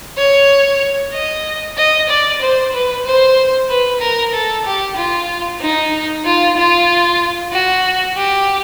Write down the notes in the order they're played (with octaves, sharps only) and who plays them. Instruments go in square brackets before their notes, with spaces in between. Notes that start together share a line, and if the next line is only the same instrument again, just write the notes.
[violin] C#5
D#5
D#5
D5
C5
B4
C5
B4
A#4
A4
G4
F4
D#4
F4
F4
F#4
G4